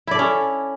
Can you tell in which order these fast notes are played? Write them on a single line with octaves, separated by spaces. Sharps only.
E4 D5 A4 C#4